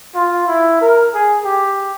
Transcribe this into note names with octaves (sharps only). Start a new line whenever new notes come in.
F4
E4
A#4
G#4
G4